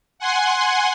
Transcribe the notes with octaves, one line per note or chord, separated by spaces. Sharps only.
F#5 G#5 C6